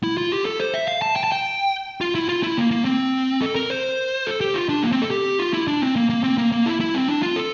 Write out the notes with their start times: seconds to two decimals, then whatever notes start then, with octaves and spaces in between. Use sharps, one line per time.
0.04 E4
0.18 F4
0.32 G4
0.45 A4
0.60 C5
0.74 E5
0.88 F5
1.02 A5
1.16 G5
1.24 A5
1.32 G5
2.01 F4
2.15 E4
2.29 F4
2.43 E4
2.57 A#3
2.71 A#3
2.85 C4
3.42 A4
3.56 A#4
3.70 C5
4.27 A4
4.41 G4
4.54 F4
4.69 D4
4.83 A#3
4.92 C4
5.02 A4
5.11 G4
5.39 F4
5.53 E4
5.68 D4
5.82 C4
5.96 A#3
6.10 A#3
6.24 C4
6.38 A#3
6.52 A#3
6.66 E4
6.80 E4
6.94 C4
7.08 D4
7.23 F4
7.36 A4